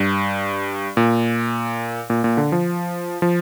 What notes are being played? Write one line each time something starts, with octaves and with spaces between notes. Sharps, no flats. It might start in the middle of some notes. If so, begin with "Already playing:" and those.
Already playing: G2
A#2
A#2
A#2
D3
F3
F3